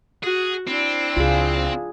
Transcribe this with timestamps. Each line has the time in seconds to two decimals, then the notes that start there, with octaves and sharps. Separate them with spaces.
0.23 F#4 G#4
0.68 C4 D4 E4
1.17 C#2 F4 G#4